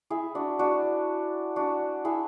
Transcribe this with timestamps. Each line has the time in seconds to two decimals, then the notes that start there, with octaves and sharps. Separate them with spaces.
0.10 E4 G#4
0.35 D4 F#4
0.59 D4 F#4
1.56 D4 F#4
2.05 E4 G#4